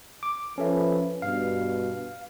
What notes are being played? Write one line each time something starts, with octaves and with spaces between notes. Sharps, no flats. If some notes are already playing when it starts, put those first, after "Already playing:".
D6
F3 C#4 A4 B4 E5
G2 B2 F5